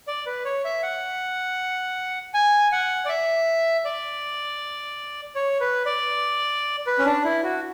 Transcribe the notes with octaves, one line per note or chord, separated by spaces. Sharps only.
D5
B4
C#5
E5
F#5
G#5
F#5
D5
E5
D5
C#5
B4
D5
B4
C#4
D4
E4
F#4